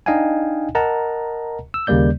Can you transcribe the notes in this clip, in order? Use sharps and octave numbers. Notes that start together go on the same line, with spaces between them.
D4 D#4 D#5 F5 G5 G#5
A#4 D#5 F#5 A5 A#5
E6
D#2 C#3 G3 A#3 D5 G6